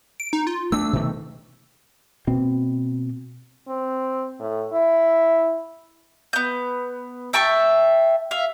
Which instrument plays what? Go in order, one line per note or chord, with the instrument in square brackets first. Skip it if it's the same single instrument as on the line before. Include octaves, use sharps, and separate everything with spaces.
[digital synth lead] D7
D#4
F4
[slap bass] A3 D4 [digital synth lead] E6
[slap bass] B2 D#3 A3
[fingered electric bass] B2 A#3 C4
[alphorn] C4
A2
E4
[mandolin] B3 G6
E5 G5 A5 C#6
E5 F5